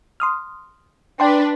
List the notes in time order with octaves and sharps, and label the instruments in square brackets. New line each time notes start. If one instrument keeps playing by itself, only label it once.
[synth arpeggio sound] C6 D#6 F6
[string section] D4 B4 [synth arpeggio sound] G5 C6